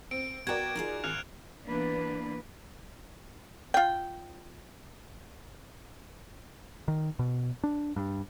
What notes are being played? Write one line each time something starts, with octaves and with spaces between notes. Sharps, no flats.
C4 D7
B3 F#4 A#4 D5 G5 G#6 E7
D#4 F4 G#4
G#1 F6 F#6 F7
E3 A#3 B3 D4 B4
F4 G5
D#3
B2
D4
G2